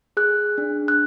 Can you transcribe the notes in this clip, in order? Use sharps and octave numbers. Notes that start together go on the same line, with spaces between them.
G#4 F#6
D4
F#6